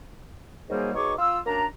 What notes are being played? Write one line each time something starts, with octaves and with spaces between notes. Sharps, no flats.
D#3 F#3 G3 A#3 G#4 C5
B2 D#4 G#4 C#5 C#6 D6
F4 E6
F#2 A#3 D4 A#5